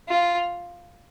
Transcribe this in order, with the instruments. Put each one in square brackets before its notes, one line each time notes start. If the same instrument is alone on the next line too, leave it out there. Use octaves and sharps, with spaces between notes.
[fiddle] F4